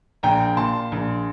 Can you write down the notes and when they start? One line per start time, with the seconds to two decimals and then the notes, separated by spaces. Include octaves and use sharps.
0.23 A#1 G5 A#5
0.57 A#2 A5 C6
0.92 A#1